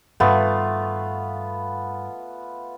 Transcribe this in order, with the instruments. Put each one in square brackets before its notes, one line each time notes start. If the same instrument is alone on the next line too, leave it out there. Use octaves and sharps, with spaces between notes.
[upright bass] G2 D#3 [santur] A3 B3 F4